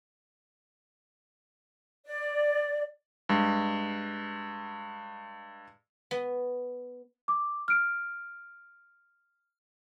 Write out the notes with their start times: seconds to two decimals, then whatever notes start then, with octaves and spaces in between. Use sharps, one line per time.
2.05 D5
3.29 G2 G#3
6.11 B3
7.28 D6
7.68 F6 D7